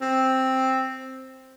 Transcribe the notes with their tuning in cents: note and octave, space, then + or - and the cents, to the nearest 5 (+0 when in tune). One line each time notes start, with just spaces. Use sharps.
C4 +5